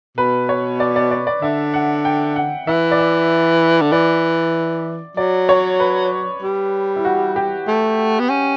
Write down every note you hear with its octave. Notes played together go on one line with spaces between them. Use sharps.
B2 B4
C#5
D5
D5
D5
D5
D3 E5
F#5
G5
F#5
E3 E5
D5
E5
D3
E3 D5
F#3 D5
C#5
B4
G3
E4
F#4
G4
A3
B3
C#4